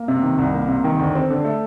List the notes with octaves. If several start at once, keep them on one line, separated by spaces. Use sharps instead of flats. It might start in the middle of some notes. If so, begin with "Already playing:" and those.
Already playing: A#3
C3
D#3
C2
A#3
C3
D#3
D2
C4
D3
A3